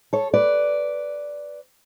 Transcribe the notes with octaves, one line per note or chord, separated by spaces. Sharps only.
A4 C#5
B4 D5